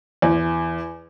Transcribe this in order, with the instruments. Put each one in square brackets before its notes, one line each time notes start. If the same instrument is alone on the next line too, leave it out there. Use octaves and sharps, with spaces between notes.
[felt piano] E2